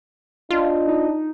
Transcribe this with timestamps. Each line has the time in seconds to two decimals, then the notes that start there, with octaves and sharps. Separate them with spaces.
0.50 D4 F4 D#5
0.88 D#4